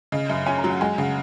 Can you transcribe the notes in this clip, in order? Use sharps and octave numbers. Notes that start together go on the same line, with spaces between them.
C#3 D#5
F#2 E5
C#4 G#5
A#5
F#3
F#5
G#3 G#5
C#3 F#5